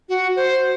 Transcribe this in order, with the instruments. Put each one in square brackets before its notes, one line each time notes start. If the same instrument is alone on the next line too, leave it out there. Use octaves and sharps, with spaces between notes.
[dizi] F#4
C5